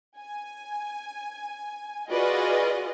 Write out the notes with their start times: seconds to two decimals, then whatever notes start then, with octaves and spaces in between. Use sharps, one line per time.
0.19 G#5
2.10 F4 F#4 G#4 B4 D5 D#5